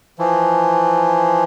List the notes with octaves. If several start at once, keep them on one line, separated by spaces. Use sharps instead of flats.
E3 F3